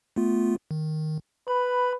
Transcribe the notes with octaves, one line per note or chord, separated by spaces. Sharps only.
A3 B3 F4
D#3
B4 B5